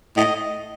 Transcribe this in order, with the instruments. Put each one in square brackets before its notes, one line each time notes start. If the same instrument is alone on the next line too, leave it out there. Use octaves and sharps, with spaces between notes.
[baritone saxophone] A2 [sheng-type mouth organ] D#5